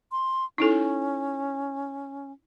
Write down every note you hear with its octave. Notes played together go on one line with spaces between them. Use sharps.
C6
C#4 D#4 E4 A4